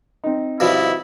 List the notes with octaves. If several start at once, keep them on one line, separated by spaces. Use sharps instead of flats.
C4 D#4
G2 B2 F3 E4